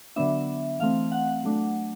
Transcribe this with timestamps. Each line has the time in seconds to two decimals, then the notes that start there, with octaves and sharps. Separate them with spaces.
0.16 D3 F#3 B3 D4 E5
0.80 E3 A3 C4 F5
1.12 F#5
1.43 F#3 A3 D4